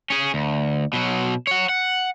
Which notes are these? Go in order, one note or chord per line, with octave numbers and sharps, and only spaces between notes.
C#4 G#4
D2
B2 F#3
C#5 F#5
F#5